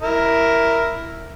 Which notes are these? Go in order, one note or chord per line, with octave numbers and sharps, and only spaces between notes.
E4 A#4